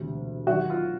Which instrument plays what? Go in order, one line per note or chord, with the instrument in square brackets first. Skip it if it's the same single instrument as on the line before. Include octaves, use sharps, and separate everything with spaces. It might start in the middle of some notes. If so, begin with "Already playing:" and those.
Already playing: [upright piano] E1 D2 C3
D#2 D#3 F#3 F#4
F4